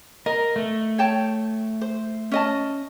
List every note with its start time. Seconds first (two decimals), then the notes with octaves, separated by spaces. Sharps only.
0.26 A#4 D#5
0.56 A3
0.98 C#5 G5 A5
1.81 C5
2.32 C#4 D#5 A5